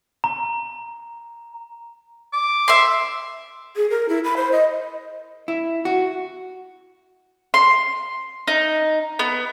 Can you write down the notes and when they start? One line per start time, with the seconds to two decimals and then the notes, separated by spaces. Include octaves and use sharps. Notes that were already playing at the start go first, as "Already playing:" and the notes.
0.24 A#5
2.33 D6
2.68 E5 C6
3.76 G#4
3.90 A#4
4.09 E4
4.24 B5
4.37 C5
4.52 D#5
5.48 E4
5.85 F#4
7.54 C6
8.47 D#4
9.19 B3